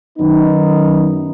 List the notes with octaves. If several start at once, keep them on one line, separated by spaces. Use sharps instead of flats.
F#2 D#3 B3 D#4